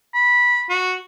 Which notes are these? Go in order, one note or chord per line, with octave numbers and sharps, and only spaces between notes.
B5
F#4